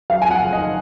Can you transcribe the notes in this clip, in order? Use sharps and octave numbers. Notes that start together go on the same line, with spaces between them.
F#3 F5
F2 G#5
F#5
F#1
D#3 D#5